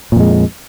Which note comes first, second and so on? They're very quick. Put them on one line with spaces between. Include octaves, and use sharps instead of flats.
A#2 F2 G#3